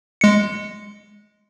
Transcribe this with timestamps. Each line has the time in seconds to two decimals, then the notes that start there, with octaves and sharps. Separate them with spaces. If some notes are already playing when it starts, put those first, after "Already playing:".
0.21 G#3 C#7